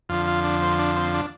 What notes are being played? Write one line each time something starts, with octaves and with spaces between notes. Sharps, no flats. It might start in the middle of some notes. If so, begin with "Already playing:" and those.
F2 D3 F3 F4
F4
D4
C4
D4
C4
D4